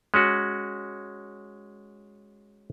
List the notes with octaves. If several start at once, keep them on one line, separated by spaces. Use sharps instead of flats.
G#3 C#4 F#4